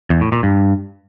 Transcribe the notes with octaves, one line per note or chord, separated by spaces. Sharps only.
E2
A2
A#2
G2